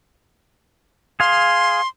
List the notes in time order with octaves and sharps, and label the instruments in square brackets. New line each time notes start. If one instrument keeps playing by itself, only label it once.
[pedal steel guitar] G#4 F5 [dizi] C6